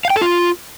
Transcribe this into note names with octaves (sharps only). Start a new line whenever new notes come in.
F5
G5
A4
F4